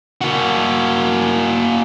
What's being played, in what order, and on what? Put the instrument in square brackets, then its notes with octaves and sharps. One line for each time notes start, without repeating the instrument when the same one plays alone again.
[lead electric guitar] A#3 F#4